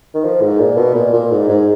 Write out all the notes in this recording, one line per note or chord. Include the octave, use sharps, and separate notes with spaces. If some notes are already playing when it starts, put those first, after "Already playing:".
D#3
F3
G#2
A#2
B2
A#2
A#2
G#2
G#2